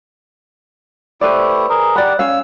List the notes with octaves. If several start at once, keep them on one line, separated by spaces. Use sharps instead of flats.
A3 E4 G4 B4 C5 D5
G#4 A#4
G4 D5 F#5 B5
C#4 F5 E6